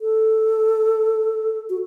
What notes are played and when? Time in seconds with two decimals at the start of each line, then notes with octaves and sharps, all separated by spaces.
0.01 A4
1.69 F#4